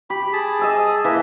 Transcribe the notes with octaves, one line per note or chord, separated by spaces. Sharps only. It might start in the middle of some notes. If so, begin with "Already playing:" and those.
G4 B5
G#4 A5
D#5 E5 G#5
E3 A#3 E5